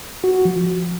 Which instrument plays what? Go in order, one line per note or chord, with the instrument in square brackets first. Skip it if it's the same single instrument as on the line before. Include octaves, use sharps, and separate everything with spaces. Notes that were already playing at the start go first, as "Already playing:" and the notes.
[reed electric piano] F#4
F#4
F3